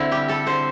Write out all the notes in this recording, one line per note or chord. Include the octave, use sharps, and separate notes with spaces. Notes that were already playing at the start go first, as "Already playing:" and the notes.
Already playing: D3 C4 E4
G3 G4
G3 A4
D3 C5